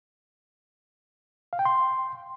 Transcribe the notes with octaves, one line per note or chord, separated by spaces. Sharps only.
F5
G5
C6